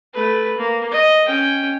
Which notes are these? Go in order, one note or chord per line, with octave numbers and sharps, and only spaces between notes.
A3 B4
A#3
D#5
C#4 G5